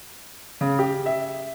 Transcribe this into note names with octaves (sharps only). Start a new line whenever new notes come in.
C#3
G4
E5